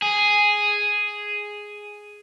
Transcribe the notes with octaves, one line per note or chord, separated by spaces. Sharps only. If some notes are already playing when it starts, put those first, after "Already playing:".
G#4